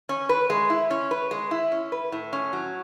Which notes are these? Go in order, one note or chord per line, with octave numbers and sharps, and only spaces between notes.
C#4
B4
G#3
E4
C#4
B4
G#3
E4
C#4
B4
A2
C#4
F#3